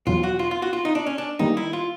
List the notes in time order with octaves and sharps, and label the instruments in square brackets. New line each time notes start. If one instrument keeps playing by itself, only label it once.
[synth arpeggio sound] E2 B2 F#3 [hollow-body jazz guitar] F4
[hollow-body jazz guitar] F#4
F4
F4
F#4
F4
D#4
D4
C#4
D4
[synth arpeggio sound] D#3 G3 A#3 [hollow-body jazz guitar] D#4
[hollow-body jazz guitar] E4
F4